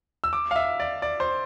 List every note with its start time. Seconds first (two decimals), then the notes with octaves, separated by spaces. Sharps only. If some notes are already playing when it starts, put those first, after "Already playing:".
0.24 E6
0.33 D6
0.51 F5
0.56 E5
0.80 D5
1.02 D5
1.20 C5